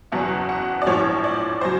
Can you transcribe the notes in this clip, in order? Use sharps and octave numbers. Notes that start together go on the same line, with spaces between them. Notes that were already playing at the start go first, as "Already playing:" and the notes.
F#1 E2 B2 F#3 F#5
F#5
D5
A#1 A2 F3 C#5
D5
C#3 F#3 C5